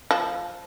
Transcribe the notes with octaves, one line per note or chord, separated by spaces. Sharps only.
F3